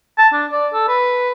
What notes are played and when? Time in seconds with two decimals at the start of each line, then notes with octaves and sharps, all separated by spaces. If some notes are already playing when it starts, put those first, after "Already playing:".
0.18 A5
0.34 D4
0.52 D5
0.73 A4
0.88 B4